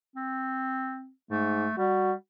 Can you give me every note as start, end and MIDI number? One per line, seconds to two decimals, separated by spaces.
0.16 1.10 60
1.31 1.67 44
1.31 1.76 57
1.78 2.13 55
1.78 2.12 66